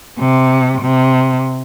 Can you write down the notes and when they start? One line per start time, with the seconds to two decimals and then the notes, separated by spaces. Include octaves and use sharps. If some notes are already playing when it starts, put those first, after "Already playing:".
0.19 C3
0.82 C3